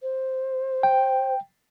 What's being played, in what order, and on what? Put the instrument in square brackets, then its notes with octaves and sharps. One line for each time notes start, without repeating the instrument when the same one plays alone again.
[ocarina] C5
[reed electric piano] G5